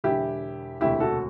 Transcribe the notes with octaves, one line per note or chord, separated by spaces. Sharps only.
E1 E2 D3 E4 G4
E1 D2 C3 E4 G4
F#4 A4